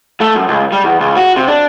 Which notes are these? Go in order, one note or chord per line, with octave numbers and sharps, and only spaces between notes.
A3
F#2
C#2
G3
E2
C#2
F#4
C3
D4